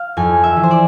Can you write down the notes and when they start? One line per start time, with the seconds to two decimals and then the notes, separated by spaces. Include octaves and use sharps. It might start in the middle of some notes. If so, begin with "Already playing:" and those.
Already playing: F5
0.17 F2 G#5
0.44 E5
0.57 E3
0.63 C5
0.71 D5